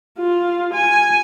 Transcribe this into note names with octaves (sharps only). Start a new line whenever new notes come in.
F4
G#5